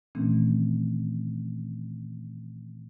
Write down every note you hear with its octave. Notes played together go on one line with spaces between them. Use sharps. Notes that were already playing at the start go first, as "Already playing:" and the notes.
A#2 D#3 E3 A3 C4 C#4